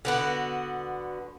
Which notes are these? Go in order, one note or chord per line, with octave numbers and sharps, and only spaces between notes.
D3 B3 F#4